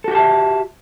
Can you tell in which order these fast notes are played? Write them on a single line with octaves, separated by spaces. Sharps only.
A4 F#4 G4 A5 E5